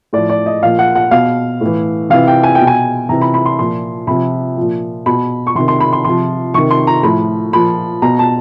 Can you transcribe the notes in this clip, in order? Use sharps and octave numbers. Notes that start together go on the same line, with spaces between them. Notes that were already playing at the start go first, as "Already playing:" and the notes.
A2 F3 D5
D5
D#5
A#2 F3 F5
F#5
F#5
B2 F5
A2 E3
C3 E3 F5
G5
G#5
G5
B2
G#5
C3 E3 A#5
B5
B5
C6
A#2 F3 C6
C3 F3 B5
A#2 F3
B2 B5
C#6
C3 D#3 C6
C6
B5
C6
C3 F3 C6
C3 D#3 C#6
C6
A#5
A2 F3 B5
A#2 F3 B5
B2 A#5
A5